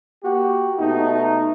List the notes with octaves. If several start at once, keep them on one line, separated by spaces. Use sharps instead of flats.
A#3 F#4 G4
B2 A3 D#4